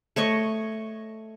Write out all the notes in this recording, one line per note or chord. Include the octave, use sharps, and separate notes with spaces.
A3 C#5 D#5 C#6